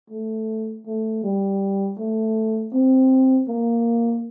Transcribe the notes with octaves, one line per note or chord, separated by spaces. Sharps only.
A3
A3
G3
A3
C4
A#3